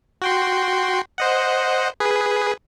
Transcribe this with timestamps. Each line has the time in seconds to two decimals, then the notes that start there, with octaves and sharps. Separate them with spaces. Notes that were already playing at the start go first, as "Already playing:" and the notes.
0.22 F#4 G5 C6
1.18 C5 D#5 F#5
2.00 G#4 B4